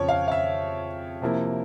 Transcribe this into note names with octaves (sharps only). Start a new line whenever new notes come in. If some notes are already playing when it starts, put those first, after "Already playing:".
Already playing: F2 C#3 F3 C#5
F5
F5
E5
C3 F3 A#3 E4